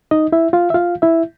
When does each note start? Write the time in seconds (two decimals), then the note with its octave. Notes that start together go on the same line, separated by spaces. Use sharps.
0.11 D#4 D#5
0.32 E4 E5
0.53 F4 F5
0.70 E5
0.74 F4 F5
1.02 E4 E5